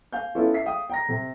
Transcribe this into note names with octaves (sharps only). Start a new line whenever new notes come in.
F5 G#5 G6
B3 C#4 E4 F4 A4
E5 B6 C7
F5 G5 D#6
G5 A#5 A#6
C3